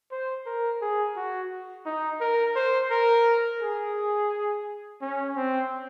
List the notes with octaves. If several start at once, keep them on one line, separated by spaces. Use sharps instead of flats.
C5
A#4
G#4
F#4
D#4
A#4
C5
A#4
G#4
C#4
C4